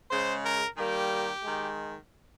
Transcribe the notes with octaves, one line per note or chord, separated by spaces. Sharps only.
C#3 G#3 C5
A#4
D#3 G3 A#3 G4
D#3 G#3